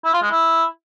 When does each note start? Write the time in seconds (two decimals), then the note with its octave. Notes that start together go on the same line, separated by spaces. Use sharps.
0.04 E4
0.13 F4
0.22 G#3
0.31 E4